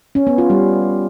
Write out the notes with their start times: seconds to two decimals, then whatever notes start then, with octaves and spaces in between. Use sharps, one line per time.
0.15 C#4
0.27 B3
0.38 F4
0.50 G3